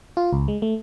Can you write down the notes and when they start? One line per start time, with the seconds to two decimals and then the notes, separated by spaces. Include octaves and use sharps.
0.17 F4
0.33 C#2
0.48 G#3
0.62 A3